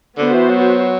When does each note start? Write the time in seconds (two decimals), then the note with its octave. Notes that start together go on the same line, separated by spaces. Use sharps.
0.18 D3 B3 F#4 C5
0.34 E3
0.50 F#3